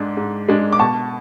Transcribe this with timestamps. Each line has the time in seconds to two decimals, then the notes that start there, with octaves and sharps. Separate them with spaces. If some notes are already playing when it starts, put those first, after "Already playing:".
Already playing: G#2 G#3 D4
0.17 G#2
0.48 G#3 D4
0.73 D6
0.79 B2 A5 C#6